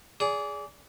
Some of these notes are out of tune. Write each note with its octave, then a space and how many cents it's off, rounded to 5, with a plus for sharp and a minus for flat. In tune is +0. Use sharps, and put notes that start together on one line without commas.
G#4 +0 D5 -25